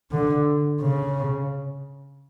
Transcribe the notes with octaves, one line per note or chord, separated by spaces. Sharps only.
D3
C#3